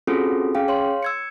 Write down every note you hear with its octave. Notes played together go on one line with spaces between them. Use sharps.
C4 C#4 F4 F#4 G#4 A4
C#4 G#4 F5 G5
C#5 F5 C6
E6 G#6 C#7